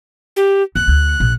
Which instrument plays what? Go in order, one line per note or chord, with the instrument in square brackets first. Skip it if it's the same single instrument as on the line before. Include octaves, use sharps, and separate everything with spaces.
[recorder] G4
[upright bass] D#2 [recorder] F#6
[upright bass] D2
A#1